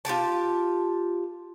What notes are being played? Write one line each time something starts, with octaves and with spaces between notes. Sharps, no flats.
F4 G4 G5 A5